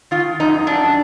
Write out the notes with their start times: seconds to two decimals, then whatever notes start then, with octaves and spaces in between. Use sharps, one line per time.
0.11 D#3 F4
0.40 F#2 D#4
0.67 F#2 D4